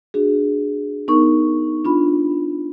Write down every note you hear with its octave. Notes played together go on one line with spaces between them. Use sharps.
D4 F#4 G#4
B3 D#4 A#4 C#6
D4 F4 B5